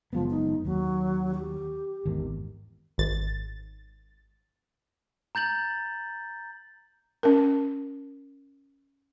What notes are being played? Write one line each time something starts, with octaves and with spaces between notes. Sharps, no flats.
F#1 F3 G#3 B3
D#4
D#2 F#3
G4
G#1 E2 D#3
G#1 A6
A#5 G6 A6 F#7
C#4 A#4